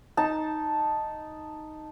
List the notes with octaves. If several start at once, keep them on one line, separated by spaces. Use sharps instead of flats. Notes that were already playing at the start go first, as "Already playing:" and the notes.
D#4 A5